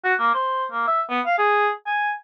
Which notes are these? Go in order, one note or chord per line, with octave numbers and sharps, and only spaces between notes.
F#4
A#3
C5
A#3
E5
B3
F5
G#4
G#5